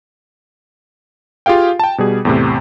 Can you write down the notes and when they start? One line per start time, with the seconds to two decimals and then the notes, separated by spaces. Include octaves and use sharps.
1.46 F4 G4 G#4 F5 G5
1.79 G5 A5
1.98 B2 G3 G#4
2.25 E2 A2 C3